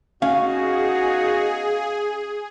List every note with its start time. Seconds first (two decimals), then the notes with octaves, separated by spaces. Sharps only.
0.22 B3 C#4 D#4 F#4 G#4 F5